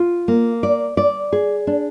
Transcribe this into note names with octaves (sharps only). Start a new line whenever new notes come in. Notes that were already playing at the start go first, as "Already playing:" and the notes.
Already playing: F4
A#3
D5
D5
G#4
D4